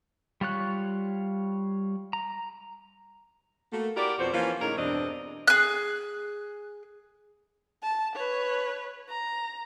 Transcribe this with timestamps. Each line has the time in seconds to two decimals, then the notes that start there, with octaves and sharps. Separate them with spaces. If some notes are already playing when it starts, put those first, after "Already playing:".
0.41 G3 F4 C#5 F#6
2.13 A#5
3.72 A3 A#3 F#4
3.96 E4 F#4 G4 A#4 D5
4.19 F2 B2 F4 F#4 C5
4.33 E3 F3 A#3 C#4 F4
4.61 A2 C#3 D#4 A#4 C#5
4.77 E2 G2 B2 C4 D4 D#5
5.48 G#4 F#6
7.83 A5
8.15 B4 C#5
9.09 A#5